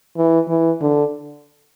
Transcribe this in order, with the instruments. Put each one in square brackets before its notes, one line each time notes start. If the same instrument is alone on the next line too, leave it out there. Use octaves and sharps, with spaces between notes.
[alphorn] E3
E3
D3